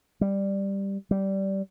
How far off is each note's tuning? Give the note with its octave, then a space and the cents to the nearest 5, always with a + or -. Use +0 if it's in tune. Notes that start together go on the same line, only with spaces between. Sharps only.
G3 +5
G3 -15